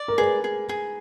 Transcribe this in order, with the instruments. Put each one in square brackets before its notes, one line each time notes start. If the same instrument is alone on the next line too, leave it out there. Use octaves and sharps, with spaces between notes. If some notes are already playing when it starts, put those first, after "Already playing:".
Already playing: [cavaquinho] D5
[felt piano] A#4
[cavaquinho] G#4 [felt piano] B4
[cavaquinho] G#4
G#4